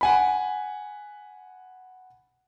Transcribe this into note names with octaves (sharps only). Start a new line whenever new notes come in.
F#5 G#5 B5